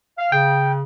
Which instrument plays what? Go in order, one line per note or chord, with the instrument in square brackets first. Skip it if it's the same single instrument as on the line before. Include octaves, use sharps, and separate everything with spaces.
[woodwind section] F5
[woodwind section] C#3 [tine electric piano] G5